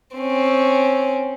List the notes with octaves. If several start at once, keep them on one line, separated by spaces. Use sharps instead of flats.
C4 C#4